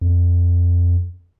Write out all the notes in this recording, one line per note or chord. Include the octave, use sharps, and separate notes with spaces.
F2